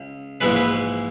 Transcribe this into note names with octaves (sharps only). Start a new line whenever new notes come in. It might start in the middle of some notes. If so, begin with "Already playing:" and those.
Already playing: C#2
A#1 G#2 E3 G#3 B4
B4